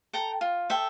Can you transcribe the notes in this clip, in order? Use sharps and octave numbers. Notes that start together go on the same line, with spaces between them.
A4 G5 A#5
F4
A4 E5 G5